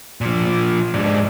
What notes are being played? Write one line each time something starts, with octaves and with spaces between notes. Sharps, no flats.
A#2 F3
G#2 D4